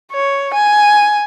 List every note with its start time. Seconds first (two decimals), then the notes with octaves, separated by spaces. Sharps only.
0.13 C#5
0.54 G#5